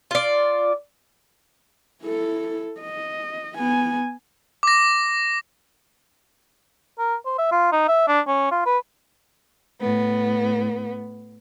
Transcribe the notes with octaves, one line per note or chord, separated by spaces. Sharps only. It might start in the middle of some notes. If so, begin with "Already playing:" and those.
F4 D5
E4 A4
D#5
B3 G#5
D6 A#6
A#4
C5
E5
F4
D#4
E5
D4
C#4
F4
B4
A2 B3